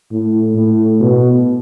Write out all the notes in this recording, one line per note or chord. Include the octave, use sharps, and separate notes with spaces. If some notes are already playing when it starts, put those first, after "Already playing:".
A2
A2
B2